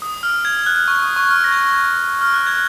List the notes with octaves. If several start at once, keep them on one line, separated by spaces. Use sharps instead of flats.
D#6
F6
G#6
F#6
C#6
D#6
C#6
F6
A#6
G#6
F6
F#6
G#6